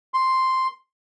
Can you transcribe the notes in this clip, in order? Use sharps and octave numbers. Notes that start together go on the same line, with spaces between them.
C6